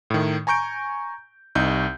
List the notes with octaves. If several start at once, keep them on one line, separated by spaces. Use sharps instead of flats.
A2 D#3
G#5 A#5 C#6 G6 D7
C2 D#4 G6